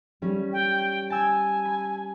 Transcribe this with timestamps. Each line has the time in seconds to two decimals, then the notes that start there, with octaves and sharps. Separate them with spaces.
0.22 G3 C#4
0.53 G5
1.10 G#5 A5 E6
1.65 B5